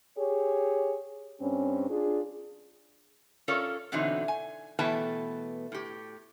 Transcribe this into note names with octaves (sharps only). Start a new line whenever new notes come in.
G4 G#4 C#5
G2 C4 C#4
D4 F4 G#4
C#4 F4 A4 A#4 C#5 D5
B2 D3 E3 F#3 C4 D#4
G#5
B2 E3 A3 B3 G5 A5
A2 G4